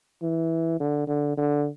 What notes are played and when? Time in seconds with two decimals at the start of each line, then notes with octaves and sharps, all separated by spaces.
0.22 E3
0.80 D3
1.08 D3
1.37 D3